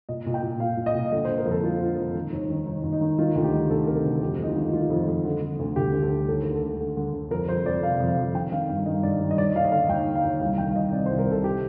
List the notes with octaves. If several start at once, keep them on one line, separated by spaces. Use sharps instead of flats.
A#2 D#5
A#2
G5
A#2
A#2 F5
A#2
D#5
A#2
D3 D#5
C5
D3
A#4
F2
A4
D3 F4
D3
F2
D#3
D#2
D#3
D#2
D#2
D#4
D#3
D#3 F4
D2
G4
D#3
D2 A4
C3 A#4
A4
D2
A4
F2 G4
D#3 D#4
F4
D#3
D#3 F4
F2
F2
D3
D3
D2
D2 G4
D2
A4
D2
D#2 A4
D3 A#4
A4
D3
D3
D3
D3
F2 A#4
F2 C5
F2 D5
C3 F5
F2
F5
F2
D#3 G5
D#3 F5
G2 F5
D#3 D#5
G2 D5
D#3
D#5
D#2 D5
D#2 F5
D#5
D3 F5
D#2 G5
D3
F5
D#2
C2 F5
D#3 G5
F5
C2 D#5
C3 D5
C2 C5
A#4
C3 A4
G4